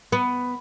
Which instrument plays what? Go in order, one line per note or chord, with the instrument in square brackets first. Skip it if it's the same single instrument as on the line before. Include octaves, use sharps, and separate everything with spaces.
[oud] B3